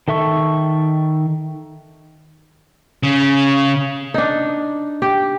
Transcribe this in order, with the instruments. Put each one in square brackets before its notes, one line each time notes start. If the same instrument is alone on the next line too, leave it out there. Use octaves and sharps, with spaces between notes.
[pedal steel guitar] D#3 A4 E5 C#6
[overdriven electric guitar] C#3
[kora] D4 D#4
G4